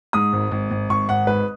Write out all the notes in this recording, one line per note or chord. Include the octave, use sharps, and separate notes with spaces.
G#2 D#6
G#1
G#1
G#1
G#1 C#6
G#1 F#5
G#2 B4